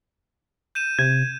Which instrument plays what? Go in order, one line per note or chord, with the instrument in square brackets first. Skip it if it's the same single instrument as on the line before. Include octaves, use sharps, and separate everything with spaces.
[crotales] G6 D#7 E7
[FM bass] C3 [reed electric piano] G#6